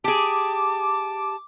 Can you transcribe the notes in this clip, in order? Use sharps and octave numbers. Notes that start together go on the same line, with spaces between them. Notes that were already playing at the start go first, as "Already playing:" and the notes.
G4 G#4 A5 D6